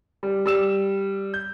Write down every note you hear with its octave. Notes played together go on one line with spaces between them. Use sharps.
G3
G3 E6 E7
G6